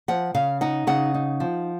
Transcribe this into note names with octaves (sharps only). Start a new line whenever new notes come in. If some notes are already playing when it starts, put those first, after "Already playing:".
F3 F#5
C#3 F5
D#4 F#5
C#3 F#5
D#4
F3